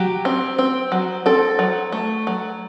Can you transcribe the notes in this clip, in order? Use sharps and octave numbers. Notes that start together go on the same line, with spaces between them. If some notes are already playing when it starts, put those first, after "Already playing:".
Already playing: F#3 G4
C4
C4
F#3
C4 A4
F#3
A3
F#3